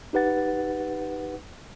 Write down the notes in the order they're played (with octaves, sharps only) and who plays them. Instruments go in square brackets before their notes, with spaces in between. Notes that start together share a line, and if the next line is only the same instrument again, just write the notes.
[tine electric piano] D#4 G4 B4 F#5 A6